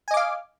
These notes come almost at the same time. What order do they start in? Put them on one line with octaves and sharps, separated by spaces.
G#5 D#5 D6 F5